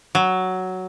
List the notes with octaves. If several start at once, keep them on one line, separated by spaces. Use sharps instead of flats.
F#3